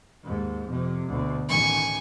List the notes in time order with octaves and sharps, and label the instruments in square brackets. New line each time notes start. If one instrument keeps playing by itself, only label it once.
[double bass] D#2 G#2
F2 C3
D2 B2
[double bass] A1 D#3 [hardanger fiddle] G#5 C#6